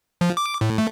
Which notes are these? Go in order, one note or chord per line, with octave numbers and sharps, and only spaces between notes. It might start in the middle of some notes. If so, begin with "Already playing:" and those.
F3
D6
A2
A3